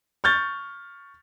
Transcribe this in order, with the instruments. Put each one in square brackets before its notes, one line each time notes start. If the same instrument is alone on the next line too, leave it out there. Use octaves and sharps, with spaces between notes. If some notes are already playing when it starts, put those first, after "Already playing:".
[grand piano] C#6 F6 G6 A6